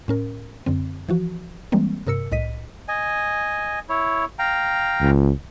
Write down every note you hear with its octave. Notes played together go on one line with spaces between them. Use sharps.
A2 C#4 A#4
F#2 D3 C4
E3 F3 F#4
E3 G3 G#3 A#3 C4
G2 C3 A#4 E6 C#7
C2 A2 D#5 B6 D#7
D#5 G#5
E4 C#5
F5 G5 A#5
C#2